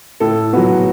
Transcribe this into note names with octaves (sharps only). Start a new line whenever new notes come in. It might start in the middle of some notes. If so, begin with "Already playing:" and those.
A2 A4
F#3 B3 F#4